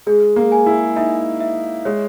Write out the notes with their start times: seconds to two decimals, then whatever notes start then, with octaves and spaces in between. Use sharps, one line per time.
0.06 G#3 G#4
0.36 A#3
0.52 G#5
0.66 E4
0.96 D#4 E5
1.40 E5
1.85 G#3 C#5